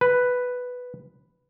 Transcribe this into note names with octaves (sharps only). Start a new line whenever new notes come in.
B4